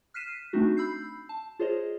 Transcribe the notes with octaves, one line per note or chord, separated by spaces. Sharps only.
F6 F#6 B6 C7 D#7 E7
A3 C4 D4 D#4 F#4
B5 E6 G6 C7
A5
F4 G#4 C5 C#5 D#5